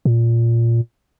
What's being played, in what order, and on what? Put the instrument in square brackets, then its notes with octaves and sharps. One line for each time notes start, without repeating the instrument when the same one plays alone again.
[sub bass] A#2